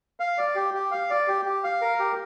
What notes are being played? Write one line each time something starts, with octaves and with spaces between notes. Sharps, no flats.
F5
D5
G4
G4
F5
D5
G4
G4
F5
A#4
G4